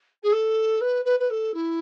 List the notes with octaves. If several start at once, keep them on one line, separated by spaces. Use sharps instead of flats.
G#4
A4
B4
B4
B4
A4
E4